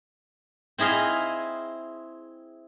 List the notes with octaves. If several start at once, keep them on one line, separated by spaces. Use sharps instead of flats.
C4 E4 G#4 D#5 F5